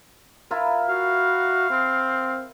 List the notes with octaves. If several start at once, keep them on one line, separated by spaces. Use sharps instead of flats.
E4 F4 A#4
F#4 F5
C4